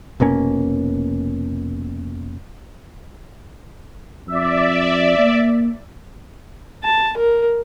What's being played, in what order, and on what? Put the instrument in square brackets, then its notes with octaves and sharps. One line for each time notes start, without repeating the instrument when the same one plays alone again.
[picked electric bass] F1 B2 A#3 C#4
[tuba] F2 [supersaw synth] D5 E5
[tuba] A#3
[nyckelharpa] A5
A#4